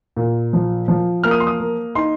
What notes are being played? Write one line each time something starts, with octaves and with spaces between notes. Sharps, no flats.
A#2
F3
F3
A#3 F6
D#6
C6
D#6
A#3
D#4 C6